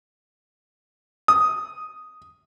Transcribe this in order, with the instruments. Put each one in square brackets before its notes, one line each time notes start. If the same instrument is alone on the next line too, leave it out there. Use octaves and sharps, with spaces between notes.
[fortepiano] D#6